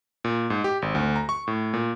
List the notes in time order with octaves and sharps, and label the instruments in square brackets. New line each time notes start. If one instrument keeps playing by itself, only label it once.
[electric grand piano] A#2
G#2
G4
G#1
D2
A#5
C#6
A2
A#2